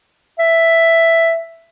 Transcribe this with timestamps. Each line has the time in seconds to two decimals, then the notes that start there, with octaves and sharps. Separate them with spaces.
0.39 E5